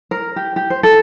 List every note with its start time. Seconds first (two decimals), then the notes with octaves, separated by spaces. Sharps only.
0.11 A#4
0.36 G4
0.56 G4
0.70 C5
0.83 A4